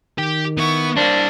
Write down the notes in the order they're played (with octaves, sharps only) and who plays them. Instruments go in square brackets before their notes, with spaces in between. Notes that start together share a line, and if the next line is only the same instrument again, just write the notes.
[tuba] D#3 [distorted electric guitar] G4
[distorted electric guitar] B3 B4 [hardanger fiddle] E4 C#6
[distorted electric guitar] G3 C5 [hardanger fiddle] A#3 [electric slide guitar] D4